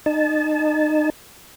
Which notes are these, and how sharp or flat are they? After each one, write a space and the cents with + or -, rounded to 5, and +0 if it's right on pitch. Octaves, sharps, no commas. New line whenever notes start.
D#4 -30 A5 -25